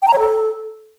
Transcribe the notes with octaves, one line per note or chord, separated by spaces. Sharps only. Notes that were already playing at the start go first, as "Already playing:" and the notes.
G5
A#5
C#5
A4